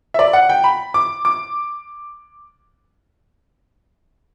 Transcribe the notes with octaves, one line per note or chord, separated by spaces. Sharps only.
E5
D5
F#5
G5
B5
D6
D6